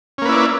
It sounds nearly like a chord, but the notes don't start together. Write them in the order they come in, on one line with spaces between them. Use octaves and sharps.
C#4 A#3 B4 E4 D5